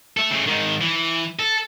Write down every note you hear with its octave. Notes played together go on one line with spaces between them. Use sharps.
A4 E5
C#3 A3
G#2 D#3
E3
A4